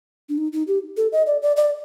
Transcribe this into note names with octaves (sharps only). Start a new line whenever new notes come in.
D4
D#4
D#4
G4
A4
D#5
D5
D5
D5